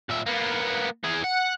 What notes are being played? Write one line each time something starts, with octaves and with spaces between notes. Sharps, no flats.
A#2 E5
A#3 B3
E3 G#4
F#5